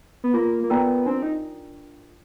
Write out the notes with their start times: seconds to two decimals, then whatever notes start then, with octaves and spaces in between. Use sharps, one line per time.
0.24 B3
0.34 A#3 F4
0.63 A#3
0.70 B3 A#4 D5 G5 A#5
1.06 C4 D4
1.22 D#4